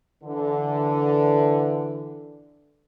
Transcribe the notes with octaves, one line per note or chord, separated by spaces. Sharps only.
D3 E3